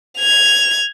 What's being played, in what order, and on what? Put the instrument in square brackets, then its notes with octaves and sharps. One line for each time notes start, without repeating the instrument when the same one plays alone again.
[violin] G#6 F7